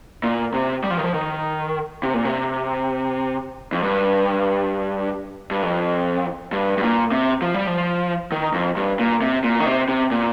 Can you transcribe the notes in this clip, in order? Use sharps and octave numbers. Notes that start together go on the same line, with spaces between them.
A#2
C3
G3
F3
D#3
F3
D#3
C3
A#2
C3
F2
G2
G2
F2
G2
G2
A#2
C3
F3
G3
F3
D#3
F2
G2
A#2
C3
A#2
D#3
C3
C3
A#2